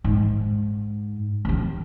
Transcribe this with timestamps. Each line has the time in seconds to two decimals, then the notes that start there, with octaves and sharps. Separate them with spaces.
0.04 G#2
1.45 D3 C4